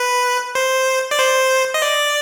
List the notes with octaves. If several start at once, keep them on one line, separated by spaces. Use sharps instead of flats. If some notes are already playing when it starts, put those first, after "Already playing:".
Already playing: B4
C5
D5
C5
D#5
D5